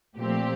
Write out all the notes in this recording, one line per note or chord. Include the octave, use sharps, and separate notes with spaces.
A#2 F3 A3 C4 G4